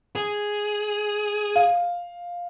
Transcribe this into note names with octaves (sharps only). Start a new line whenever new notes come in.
G#4
F5